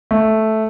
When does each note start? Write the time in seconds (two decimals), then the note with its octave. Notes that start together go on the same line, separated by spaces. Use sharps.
0.11 A3